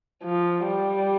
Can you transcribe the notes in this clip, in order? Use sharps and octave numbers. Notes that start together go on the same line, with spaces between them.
F3
G3